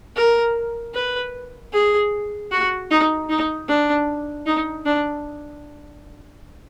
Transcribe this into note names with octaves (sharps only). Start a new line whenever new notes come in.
A#4
B4
G#4
F#4
D#4
D#4
D4
D#4
D4